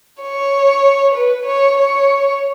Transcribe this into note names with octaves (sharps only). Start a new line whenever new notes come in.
C#5
B4
C#5
C#5